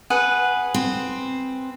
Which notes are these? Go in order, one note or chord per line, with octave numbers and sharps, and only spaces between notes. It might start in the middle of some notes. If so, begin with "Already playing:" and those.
G#4 B4 F#5
C4